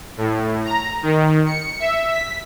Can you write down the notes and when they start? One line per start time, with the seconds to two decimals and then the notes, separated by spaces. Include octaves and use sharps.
0.18 A2
0.65 A#5
1.03 D#3
1.46 C#7
1.80 E5
2.10 B6